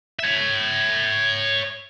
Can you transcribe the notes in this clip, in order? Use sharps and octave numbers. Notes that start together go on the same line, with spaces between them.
C#5 E5